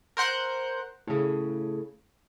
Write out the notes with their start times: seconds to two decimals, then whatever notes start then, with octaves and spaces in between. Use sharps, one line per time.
0.17 A#4 C5 F#5 F#6 G6
1.07 A2 C#3